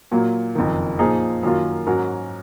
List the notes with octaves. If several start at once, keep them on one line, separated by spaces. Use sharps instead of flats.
A#2 F#3 A#3
F#1 F2 D#3
A#2 F3 A#3 D#4 G#4
F#2 D#3 F#3 A#3 F4
G#2 F#3 C#4 F#4 A#4